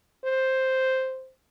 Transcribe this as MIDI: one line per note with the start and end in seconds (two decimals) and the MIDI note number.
0.25 1.31 72